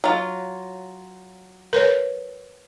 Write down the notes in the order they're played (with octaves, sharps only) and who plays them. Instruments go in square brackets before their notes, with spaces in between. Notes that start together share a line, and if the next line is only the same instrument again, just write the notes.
[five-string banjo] F#3 F4
[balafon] A#4 B4 C#5